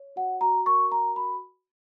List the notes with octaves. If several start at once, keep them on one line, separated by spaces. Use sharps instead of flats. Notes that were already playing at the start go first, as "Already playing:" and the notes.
Already playing: C#5
F#4 F#5
F#4 A#5
A#4 C#6
F#4 A#5
F#4 B5